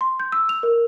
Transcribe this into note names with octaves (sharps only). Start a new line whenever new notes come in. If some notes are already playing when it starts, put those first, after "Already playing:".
C6
G6
E6
F7
A#4